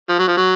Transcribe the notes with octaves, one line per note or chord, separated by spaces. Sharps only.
F3
F#3
F3
F#3